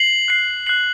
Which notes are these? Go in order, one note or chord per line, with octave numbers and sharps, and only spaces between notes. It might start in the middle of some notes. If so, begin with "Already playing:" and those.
Already playing: C7 F#7
F#6 C7 F#7
F#6 C7 F#7